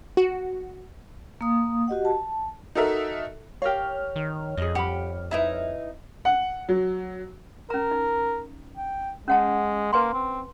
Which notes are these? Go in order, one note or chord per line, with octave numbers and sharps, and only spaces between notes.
F#4
A#3 F5 D#6
F#4 G4 D#5 F#5
A5
D#4 F#4 A4 A#4 E5
G4 A#4 C#5 F5 F6
D#3
F2 G#4 D#5
G4 F#5 B5
D#4 E4 B4 E5 A#5
F#5
F#3
C#4 A#4 A#5
D#4
G5
G#3 C#4 F#5 A5
A#3 B4 G#5 C6
C4